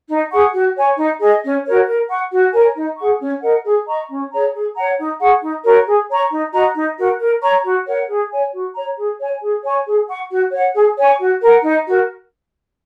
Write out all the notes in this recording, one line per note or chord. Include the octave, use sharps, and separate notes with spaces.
D#4
G#4 F#5 C#6
F#4
C#5 G#5 C#6
D#4
G#4 D#5
C#4
F#4 A#4 C#5
A#4
F#5 C#6
F#4
A#4 C#5 G#5
D#4
G#4 F#5 C#6
C#4
A#4 D#5 F#5
G#4
D#5 A#5 C#6
C#4
G#4 C#5 A#5
G#4
C#5 F#5 A#5
D#4
G#4 F#5 C#6
D#4
F#4 A#4 C#5
G#4
C#5 A#5 C#6
D#4
F#4 D#5 A#5
D#4
F#4 A#4
A#4
C#5 A#5 C#6
F#4
A#4 C#5 F#5
G#4
C#5 G#5
F#4
C#5 A#5
G#4
C#5 G#5
G#4
C#5 G#5 C#6
G#4
F#5 C#6
F#4
C#5 F#5
G#4
C#5 G#5 C#6
F#4
A#4 F#5
D#4
F#4 A#4